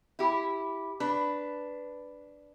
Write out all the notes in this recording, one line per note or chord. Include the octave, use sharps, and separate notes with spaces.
E4 G4
D4 B4